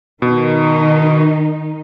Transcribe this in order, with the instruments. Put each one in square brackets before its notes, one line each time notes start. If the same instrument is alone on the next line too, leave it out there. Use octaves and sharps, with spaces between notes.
[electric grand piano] B2 [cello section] D#3 D#4